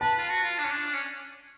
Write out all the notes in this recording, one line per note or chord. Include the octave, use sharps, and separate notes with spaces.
B4 A5
F4
F#4
F4
D4
C#4
D4
D4
C#4